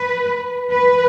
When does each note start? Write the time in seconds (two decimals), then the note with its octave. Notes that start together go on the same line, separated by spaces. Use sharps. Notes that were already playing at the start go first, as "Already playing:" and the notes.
Already playing: B4
0.71 B4